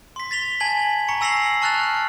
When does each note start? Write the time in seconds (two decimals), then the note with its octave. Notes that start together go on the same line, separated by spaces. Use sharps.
0.16 C6 B6
0.31 A6 B6 F7 G7
0.60 G#5 A5 G#6 B6 F#7
1.09 A#5 C#6 C#7
1.21 G#5 E6 A#6 C7 F7 F#7
1.62 A5 C#6 F6 F#6 A6 F7